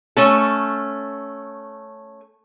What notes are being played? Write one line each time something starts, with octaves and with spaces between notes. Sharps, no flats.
A3 C#4 A4